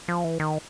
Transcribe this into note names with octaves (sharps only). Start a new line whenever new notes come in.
F3
E3
D#3